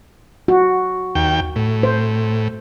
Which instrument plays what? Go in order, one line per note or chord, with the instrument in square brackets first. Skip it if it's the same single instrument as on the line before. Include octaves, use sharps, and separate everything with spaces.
[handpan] F#4
[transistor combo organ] D#2 G5
A2
[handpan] C5